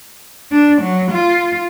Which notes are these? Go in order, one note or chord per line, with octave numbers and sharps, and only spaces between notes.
D4
F#3
F4